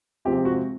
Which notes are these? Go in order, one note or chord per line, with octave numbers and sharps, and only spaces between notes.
C3 F3 G#3 C4 G4
F#4